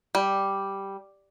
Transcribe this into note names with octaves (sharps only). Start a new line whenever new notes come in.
G3